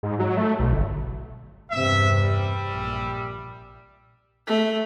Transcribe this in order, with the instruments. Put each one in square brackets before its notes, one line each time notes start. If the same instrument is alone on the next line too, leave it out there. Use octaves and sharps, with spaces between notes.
[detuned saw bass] G#2
F#3
A3
B1
G1
[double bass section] E2 G2 C3 [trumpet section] E5
[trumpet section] G3 E5
[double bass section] A#1 A#2
[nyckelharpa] A3